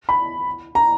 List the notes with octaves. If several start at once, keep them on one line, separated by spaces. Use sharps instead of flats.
B5
A#5